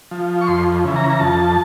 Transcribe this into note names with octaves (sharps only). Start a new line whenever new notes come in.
F3
C#6
F2 C6
C#3 E3
A#5
A#5
F2 A5